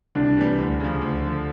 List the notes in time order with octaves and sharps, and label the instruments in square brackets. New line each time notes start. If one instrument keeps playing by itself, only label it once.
[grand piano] C2 [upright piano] D4
[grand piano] C3 E3 G3
D2
C#3 F3
D2
D3 F3